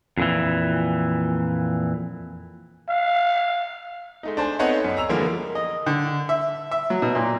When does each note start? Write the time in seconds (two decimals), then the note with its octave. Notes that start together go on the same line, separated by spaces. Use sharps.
0.17 F2 A#2 E3
2.89 F5
4.23 G#3 A3 D#4
4.37 D4 C5 G#5
4.59 A3 B3 C4 D#4 C#5 F#5
4.84 F#2
4.97 A#5 E6 F7
5.09 D3 E3 F3 G3 G#3 A#3
5.55 D#5
5.86 D3
6.29 E5
6.71 E5
6.90 F#3
7.02 B2
7.15 A#2